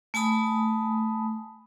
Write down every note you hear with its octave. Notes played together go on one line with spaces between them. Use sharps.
A3 G#5 A5 B5 D#6